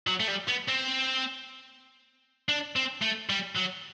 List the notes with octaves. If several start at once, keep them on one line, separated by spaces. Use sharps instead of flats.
F#3
A3
G3
B3
C4
D4
C4
A3
G3
F#3